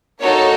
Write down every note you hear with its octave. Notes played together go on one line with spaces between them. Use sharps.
A#3 D#4 F#4 A4 C#5